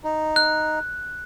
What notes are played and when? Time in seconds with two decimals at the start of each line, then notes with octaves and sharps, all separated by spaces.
0.04 D#4
0.36 F#6